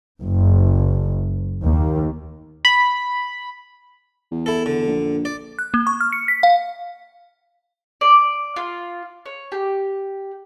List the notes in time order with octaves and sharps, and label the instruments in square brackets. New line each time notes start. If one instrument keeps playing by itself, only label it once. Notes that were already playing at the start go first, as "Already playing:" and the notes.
[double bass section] F#1
D#2
[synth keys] B5
[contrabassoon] E2
[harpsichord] E4 A4
D3
[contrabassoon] A#1
[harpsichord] D5
[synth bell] F#6
A#3
C#6
F6
C#7
B6
F5
[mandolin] D5
F4
C#5
G4